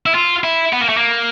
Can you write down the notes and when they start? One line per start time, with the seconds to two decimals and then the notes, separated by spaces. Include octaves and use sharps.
0.06 E4
0.15 F4
0.44 E4
0.73 B3
0.81 A#3
0.89 A3
0.97 A#3